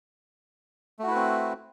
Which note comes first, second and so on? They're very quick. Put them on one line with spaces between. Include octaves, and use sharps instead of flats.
A3 F#4 E4 B4 C4